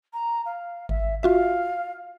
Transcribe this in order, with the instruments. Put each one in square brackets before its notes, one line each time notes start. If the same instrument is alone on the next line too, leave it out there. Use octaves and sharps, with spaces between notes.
[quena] A#5
F5
[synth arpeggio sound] G#1 [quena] E5
[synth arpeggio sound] F4 F#4 E5 [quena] F5